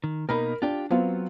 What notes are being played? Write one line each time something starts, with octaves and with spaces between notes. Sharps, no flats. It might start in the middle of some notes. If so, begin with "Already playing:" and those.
D#3
B2 A#3 D#4 A#4 B5
D4 F4 G4
F#3 B3 C4 F4